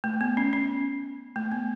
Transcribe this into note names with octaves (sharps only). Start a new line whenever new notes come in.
A3
B3
C#4
C#4
A3
B3